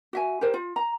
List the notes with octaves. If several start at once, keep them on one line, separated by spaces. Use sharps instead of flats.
F#4 E5 G#5
G4 A#4 C5
F4
A#5